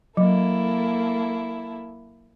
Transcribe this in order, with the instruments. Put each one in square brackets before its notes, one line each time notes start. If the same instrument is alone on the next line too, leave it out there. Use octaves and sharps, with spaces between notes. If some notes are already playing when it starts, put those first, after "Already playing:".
[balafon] F#3 [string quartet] A#3 E4 A4